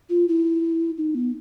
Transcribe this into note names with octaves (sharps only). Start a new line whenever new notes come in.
F4
E4
D#4
B3